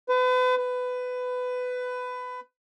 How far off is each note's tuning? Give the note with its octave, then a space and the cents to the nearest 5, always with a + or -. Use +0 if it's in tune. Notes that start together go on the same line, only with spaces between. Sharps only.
B4 +40
B4 +20